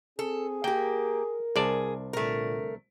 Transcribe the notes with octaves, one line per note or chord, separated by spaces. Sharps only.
C4 G#4 A4
A#3 G4 A#4 G5
C2 G#4 D5 A5
A#2 D3 A3 A#4